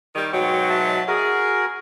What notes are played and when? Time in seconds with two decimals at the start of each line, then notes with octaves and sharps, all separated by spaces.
0.15 D#3 G3
0.32 G#2 B2 F#3 G5 C#6
0.70 E5 A5
1.08 F#4 G#4 A#4